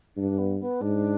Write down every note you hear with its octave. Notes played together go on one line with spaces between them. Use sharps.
G2 D4
B3
B3
G#2 D4